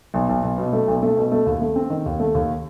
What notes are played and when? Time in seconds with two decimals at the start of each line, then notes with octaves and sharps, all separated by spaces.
0.14 B1
0.29 B1
0.43 B1
0.58 B2
0.73 A3
0.88 B1
1.02 A3
1.17 B2
1.32 A3
1.46 D#2
1.61 A3
1.76 C4
1.90 D#3
2.06 D#2
2.20 A3
2.35 D#2